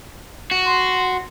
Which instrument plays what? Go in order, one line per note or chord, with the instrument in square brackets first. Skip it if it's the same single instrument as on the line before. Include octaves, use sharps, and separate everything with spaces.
[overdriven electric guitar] F#4
[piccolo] C6